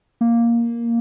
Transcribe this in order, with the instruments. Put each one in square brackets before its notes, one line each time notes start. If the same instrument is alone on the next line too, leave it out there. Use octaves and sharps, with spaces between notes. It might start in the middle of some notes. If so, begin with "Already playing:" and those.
[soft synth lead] A#3